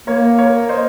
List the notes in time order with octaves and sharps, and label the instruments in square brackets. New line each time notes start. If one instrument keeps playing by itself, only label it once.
[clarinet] A#3 [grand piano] A#4 C#5
[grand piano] A#4 C#5
C5 D#5